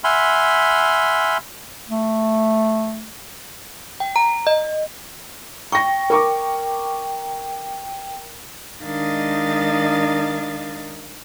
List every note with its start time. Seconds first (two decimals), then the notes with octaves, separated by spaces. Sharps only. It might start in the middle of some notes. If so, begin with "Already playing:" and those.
0.04 E5 F#5 G#5 B5 C6 F6
1.88 A3
4.00 G5
4.16 A#5
4.47 D#5
5.72 G5 C#6 A#6
6.10 A#4 C#6 D6
8.83 D#3 G#3 D4 D#5 F5 A6